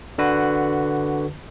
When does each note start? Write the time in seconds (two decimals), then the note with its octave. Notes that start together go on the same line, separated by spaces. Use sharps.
0.18 D3 F#4 B4